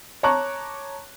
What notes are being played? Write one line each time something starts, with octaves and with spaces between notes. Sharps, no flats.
C#5 A5 A#5 C#6 D6 F#6